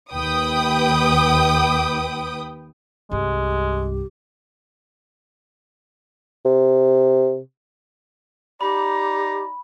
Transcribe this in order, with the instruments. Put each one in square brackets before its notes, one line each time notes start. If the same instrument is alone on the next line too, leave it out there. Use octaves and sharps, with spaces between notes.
[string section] D#2 B4 G5 D#6
[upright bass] C2 G2 [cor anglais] G#3 [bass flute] G4
[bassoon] C3
[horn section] D#4 D5 A#5 [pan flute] G4 [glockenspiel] B5